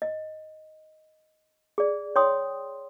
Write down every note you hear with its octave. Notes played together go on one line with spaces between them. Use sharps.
D#5
G#4 D5
C#5 G5 C6 D#6